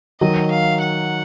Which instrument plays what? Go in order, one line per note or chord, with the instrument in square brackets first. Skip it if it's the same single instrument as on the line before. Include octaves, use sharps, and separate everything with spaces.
[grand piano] D#3 F#3 [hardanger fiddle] D#5
[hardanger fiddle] F5
F#5